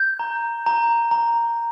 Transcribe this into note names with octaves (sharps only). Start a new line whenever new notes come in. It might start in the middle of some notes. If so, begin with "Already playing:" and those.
Already playing: G6
A#5
A#5
A#5